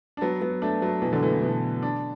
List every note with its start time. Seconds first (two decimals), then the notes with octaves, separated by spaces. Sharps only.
0.17 D4
0.21 F#3 B3
0.42 F#3 B3
0.62 A3 D4
0.82 F#3 B3
1.02 B2 E3
1.12 D3 F#3
1.23 E3 A3
1.32 B2
1.42 B2 E3
1.83 D4